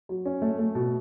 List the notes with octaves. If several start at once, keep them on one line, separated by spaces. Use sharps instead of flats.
F#3
C#4
A3
A3
B2